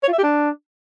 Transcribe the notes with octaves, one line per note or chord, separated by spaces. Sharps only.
C#5
F4
E5
G4
D4